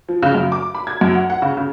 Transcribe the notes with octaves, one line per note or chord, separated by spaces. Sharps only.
F3
C#3
F#2
D6
B5
G#6
F#2
F#5
F#5
C#3
C#3